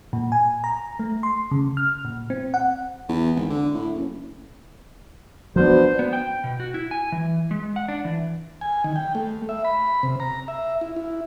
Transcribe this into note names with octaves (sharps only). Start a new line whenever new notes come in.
A#2
G#5
A#5
A3
C6
C#3
F6
A#2
C4
F#5
E2
G#1
D3
A2
F#1
F3 B3 D4 F#4 B4 C5
B3
G5
B2
F#4
E4
G#5
E3
G#3
F#5
D4
E3
G#5
D#3
G5
A3
E5
B5
C3
A#5
E5
E4
E4